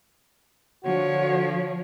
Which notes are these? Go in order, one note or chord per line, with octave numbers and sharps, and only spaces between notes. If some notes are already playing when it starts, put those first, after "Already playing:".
D3 F3 F#4 C#5